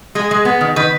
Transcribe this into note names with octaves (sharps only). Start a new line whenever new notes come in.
G#3 G#4
G#3
B3
D#3
D#3 B4